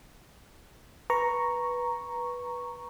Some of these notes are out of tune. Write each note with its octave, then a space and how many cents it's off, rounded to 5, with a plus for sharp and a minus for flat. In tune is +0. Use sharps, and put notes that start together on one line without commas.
B4 -10 A#5 +0 C#6 +0